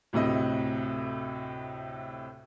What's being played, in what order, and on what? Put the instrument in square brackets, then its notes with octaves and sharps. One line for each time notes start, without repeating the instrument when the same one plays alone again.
[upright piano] D2 A2 C3 D#5